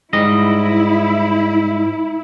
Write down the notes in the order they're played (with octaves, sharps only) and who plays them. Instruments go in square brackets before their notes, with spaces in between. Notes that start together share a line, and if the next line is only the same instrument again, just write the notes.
[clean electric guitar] G#2 G3 D#5 [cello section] E4